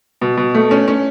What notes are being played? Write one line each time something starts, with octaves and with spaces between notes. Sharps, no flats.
B2
B2
A3
C#4
C#4